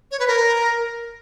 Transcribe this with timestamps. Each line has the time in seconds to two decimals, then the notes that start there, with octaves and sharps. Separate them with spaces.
0.11 C#5
0.20 B4
0.28 A#4